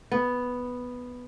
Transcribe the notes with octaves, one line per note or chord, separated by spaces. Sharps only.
B3